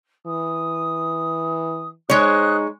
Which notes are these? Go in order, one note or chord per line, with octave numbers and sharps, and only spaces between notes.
E3 D#6
G#3 D#4 C5 C#5 D#6 F#6